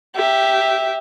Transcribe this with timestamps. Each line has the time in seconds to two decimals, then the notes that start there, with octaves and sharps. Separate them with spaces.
0.16 G4 E5